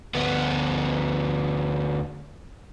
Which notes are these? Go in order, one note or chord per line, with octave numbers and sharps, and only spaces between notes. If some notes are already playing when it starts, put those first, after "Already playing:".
D2 B3